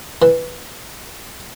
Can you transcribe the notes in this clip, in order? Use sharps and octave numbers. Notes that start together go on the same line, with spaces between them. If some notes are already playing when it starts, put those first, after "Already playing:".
E3